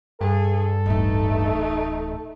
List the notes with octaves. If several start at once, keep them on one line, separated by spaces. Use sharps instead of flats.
G2 G#4 A4
D1 A1 A3 D#4